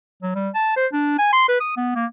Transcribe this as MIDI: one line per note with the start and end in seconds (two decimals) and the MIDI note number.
0.22 0.33 54
0.35 0.49 55
0.54 0.73 81
0.76 0.86 72
0.93 1.16 62
1.18 1.30 80
1.33 1.46 84
1.49 1.60 71
1.60 1.75 87
1.77 1.95 59
1.95 2.06 58